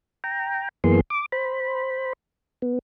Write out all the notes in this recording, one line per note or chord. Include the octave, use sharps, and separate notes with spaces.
G5 A#5
F#2 E3 A#3 B3 G#4 C6
D6
C5 B5
B3